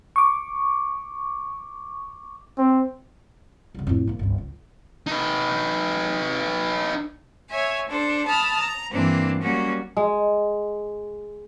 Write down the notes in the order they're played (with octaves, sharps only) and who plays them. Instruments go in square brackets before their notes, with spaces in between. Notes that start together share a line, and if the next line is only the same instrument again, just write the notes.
[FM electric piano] C#6 D6
[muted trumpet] C4
[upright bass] C2 C#3
F2 A2
G#2 A#3
G1 C#2
C#2
[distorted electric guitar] D#4 B4
[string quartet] C#5 E5 G#5
D4 A4 C5
A5 B5 D#6 F6
A#5
G2 E3 A#3 C4 D4
F#3 G3 A#3 C#4 F#4
[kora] G#3